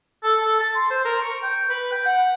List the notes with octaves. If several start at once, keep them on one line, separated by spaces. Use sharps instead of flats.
A4
A4
A5
C6
C5
A#4
C#6
G5
B4
G5
F#5